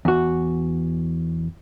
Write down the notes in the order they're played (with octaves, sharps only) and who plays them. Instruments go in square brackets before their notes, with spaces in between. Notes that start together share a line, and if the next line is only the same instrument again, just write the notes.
[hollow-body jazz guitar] E2 F#4